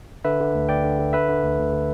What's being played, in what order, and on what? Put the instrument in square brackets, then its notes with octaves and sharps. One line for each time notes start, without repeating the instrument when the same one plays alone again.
[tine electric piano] D3 B4 E5
D3
D2
D2 D5 G5
D3
D3
D3 B4 E5
D3
D2
D2
D3